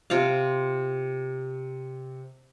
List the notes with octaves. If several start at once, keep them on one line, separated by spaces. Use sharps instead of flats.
C3 F4 C5 F5